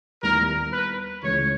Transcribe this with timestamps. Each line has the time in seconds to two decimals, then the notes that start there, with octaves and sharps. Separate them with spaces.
0.23 D#2 D#3 G3 B3 E4 A#4
0.73 B4
1.23 C#2 C#3 E3 C#5